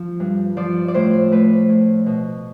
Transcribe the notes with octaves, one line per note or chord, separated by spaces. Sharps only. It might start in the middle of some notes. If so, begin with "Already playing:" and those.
Already playing: F3
G2
F3 D5
D5
A2 C5
A3 B4
A2
B2